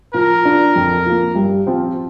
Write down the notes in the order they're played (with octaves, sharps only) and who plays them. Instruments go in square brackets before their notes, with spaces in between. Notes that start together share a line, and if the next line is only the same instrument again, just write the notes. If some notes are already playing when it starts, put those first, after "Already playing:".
[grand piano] F3 [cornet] A#4
[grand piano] D4 F4
F2
F3 A#3
G2
F3 C4 F4